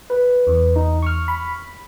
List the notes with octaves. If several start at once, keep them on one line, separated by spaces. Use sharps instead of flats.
B4
E2
D#4
C#6 F6
B5